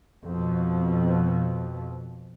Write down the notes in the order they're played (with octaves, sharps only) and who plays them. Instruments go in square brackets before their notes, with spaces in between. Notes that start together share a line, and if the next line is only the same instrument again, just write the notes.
[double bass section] F2 B2